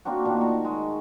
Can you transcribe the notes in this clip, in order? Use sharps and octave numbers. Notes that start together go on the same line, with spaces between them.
A#3 C4 D4 F#4
A#2 D#3 A3 D4
A5 A#5 C#6
G#3